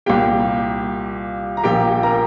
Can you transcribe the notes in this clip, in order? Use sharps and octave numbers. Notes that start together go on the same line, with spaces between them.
C2 A#2 A#3 G4 G5
A#5
A#1 A#2 A#3 G4 G5
A#4 A#5